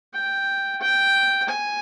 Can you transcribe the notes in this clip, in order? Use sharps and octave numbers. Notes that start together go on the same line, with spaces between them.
G5
G5
G#5